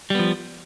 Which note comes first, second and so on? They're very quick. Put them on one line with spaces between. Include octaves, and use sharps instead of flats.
G3 B3 F3